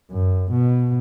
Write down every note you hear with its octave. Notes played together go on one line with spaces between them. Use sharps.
F#2
B2